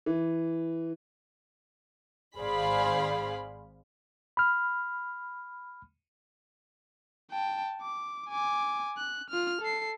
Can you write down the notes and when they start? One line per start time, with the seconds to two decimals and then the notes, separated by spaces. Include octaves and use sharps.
0.06 E3
2.39 G#1 G#4 C5 D5 F5 B5
4.37 B5 F6
7.31 G5 A5
7.82 D6
8.29 G#5 D6
8.98 F#6
9.30 F4 F6
9.61 A4 C7